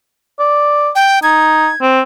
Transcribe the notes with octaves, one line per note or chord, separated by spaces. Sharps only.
D5
G5
D#4 G#6
C4